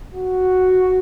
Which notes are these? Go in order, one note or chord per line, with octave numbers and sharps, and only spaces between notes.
F#4